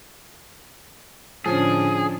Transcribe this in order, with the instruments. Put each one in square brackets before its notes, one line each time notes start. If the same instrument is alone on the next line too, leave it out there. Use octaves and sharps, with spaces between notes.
[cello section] A2 D3 D4 [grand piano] F3 C#4 [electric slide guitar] G#4